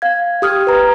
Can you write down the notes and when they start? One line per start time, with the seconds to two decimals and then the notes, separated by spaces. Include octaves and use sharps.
0.02 F5 G#6
0.42 G4 D#6 F6 G#6
0.67 B4 A#5